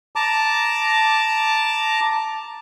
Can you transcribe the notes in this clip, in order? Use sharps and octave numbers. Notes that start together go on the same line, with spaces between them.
A5 A#5 D6